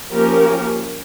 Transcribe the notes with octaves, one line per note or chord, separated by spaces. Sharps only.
F3 A#3 C#4 G4 A#4